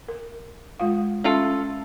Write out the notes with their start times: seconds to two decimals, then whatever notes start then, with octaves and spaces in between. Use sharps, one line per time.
0.08 A#4
0.80 G#3 F4 F5
1.24 A3 C#4 F4 A4